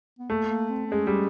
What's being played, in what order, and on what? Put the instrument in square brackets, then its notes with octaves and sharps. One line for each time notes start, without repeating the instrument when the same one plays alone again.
[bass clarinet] B3
[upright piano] A3 [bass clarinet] A#3
[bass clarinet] A#3
C4
C4
[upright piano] G#3 [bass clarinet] C#4
[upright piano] G3